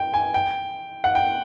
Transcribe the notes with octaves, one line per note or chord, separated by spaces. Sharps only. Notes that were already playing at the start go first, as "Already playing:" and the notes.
Already playing: G5
G#5
G5
F#5
G5